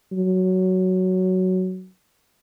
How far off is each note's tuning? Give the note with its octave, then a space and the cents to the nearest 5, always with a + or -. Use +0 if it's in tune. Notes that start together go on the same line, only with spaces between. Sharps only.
F#3 +5